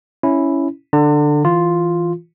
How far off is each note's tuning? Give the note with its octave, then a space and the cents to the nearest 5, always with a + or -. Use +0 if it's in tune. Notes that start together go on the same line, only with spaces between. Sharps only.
C#4 +0 E4 +0
D3 +10 A5 +45
E3 -5 F4 +0